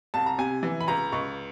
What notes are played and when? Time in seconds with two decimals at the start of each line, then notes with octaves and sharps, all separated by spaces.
0.14 C2 A5
0.26 A#5
0.38 C3 G#5
0.63 E3
0.81 B5
0.88 C#2 A#5
1.12 C#2 C#6